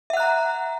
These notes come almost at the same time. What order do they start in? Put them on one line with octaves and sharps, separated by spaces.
E5 F#5 F#6 A#5